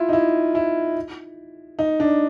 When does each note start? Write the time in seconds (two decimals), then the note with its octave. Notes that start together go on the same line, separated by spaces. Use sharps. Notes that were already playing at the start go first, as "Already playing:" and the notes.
Already playing: E4 F4
0.09 D#4
0.13 E4
0.55 E4
1.79 D#4
2.00 D4